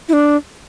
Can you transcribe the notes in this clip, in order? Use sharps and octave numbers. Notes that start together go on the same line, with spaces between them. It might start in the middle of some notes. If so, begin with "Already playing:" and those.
E4
D4